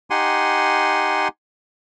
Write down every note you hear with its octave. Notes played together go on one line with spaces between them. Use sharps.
D#4 G4 F#5 G#5 C6